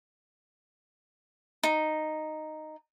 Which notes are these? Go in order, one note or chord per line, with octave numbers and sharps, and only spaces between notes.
D#4